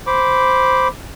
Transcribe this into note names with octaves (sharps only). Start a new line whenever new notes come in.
C5 B5 D6